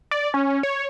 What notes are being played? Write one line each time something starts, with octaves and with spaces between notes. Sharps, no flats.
D5
C#4
C#5